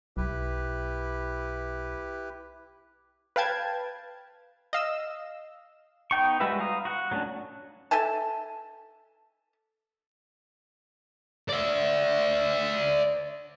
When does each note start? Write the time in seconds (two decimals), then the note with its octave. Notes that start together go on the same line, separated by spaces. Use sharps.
0.17 B1 E4 G4 B4
3.36 B4 F5 G5 A5 G#6
4.73 D#5 F5 E6 E7
6.11 B3 D#4 G5 C#6
6.40 G3 G#3 F#4 B4 E5
6.60 F5 A#5 D#6
6.85 F#4 F#5
7.11 F#3 A3 C#4 D4
7.91 A4 E5 G#5 A5
11.49 D5 E5